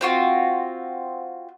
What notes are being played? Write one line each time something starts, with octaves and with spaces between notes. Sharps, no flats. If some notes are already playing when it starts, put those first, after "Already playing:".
C4 F4 F#4